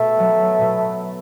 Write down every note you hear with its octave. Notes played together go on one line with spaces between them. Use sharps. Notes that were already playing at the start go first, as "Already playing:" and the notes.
Already playing: B2 A3
F#3 B3
B2